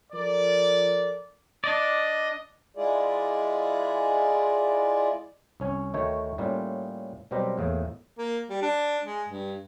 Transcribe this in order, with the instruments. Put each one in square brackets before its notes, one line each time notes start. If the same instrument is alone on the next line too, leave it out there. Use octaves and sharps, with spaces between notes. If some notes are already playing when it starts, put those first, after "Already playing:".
[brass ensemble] F3 A4 A#4 D5
[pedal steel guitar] D4 D5 [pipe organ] D#5
[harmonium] G#3 E4 F4 G#4 D5
[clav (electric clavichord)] C2 C#4 C#5
D2 D#3 A3 A4 C#5 G5
A2 G3 A#3 C#4 F4
B2 F#3 G3 C4 G4 A#4
E2 A2 A#3
[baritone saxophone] A#3
G3
D4
G#3
G2